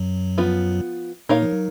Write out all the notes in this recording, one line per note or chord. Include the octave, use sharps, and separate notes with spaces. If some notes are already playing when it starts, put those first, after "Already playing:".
Already playing: F#2 F#3
F3 B3 F4
A#2 A#3 D#4 A#4 C#5 F5
F3
F#3